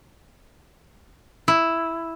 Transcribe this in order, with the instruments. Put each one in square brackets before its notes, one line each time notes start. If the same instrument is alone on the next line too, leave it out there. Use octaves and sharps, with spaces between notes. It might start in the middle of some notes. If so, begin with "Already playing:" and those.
[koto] E4